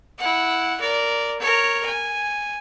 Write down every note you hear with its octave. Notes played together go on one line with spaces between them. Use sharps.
E4 F#5
A#4 D5
A#4 C#5
G#5